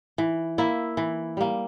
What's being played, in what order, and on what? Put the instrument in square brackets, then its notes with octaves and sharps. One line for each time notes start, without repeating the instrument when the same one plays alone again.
[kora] E3
A#3 E4
E3
G3 A#3